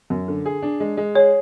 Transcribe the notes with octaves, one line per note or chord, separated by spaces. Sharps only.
F#2
D3
G#4
D4
G#3
G#3
G#4 C#5